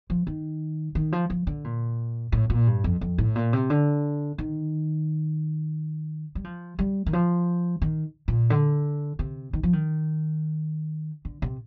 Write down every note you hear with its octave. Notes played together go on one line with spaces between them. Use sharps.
F3
D#3
D#3
F3
F3
D3
A#2
A2
A#2
G2
F2
F2
A2
A#2
C3
D3
D#3
G3
F3
G3
D#3
F3
D#3
A#2
D3
C3
D#3
F3
D#3
D3
C3